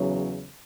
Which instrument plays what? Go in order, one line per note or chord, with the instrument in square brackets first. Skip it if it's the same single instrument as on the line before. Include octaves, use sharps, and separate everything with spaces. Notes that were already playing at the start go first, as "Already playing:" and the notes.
Already playing: [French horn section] E2 C#3 F#3